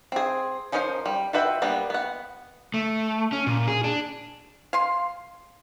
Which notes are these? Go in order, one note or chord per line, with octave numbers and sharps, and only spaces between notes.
C4 G#4
F3 C#4 D#4 A#4 C5
G3
F4 F#4 B4 E5 G5
G3 A#3 B3 D4
B3 F#5
A3
C#4
A#2
G#4
D4
F5 C6